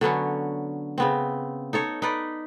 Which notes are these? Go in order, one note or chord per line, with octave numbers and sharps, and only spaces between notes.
D3 F#3 B3 C#4
C#3 B3 C4
D#4 A4 C#5
D#4 B4 D5